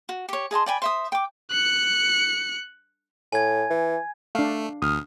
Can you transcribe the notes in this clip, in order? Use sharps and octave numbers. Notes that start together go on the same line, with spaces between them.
F#4
G4 C#5
G#4 D#5 A5 C6
D5 G5 G#5 B5
C5 E5 D#6
G5 D6
F#6 C#7
A2 G#5 G#6
E3
A3 D4 F5
D2 D#6 F6